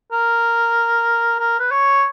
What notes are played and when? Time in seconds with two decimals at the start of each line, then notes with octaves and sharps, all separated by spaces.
0.12 A#4
1.39 A#4
1.59 B4
1.71 C#5